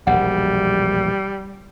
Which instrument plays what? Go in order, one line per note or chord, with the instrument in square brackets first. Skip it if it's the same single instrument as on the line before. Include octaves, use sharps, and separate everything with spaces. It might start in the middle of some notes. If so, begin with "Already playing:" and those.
[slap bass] E1 A#1 [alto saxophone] G3 [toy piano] F#5